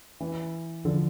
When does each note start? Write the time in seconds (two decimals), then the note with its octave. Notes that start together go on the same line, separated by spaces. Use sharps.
0.20 E3
0.85 D3 F3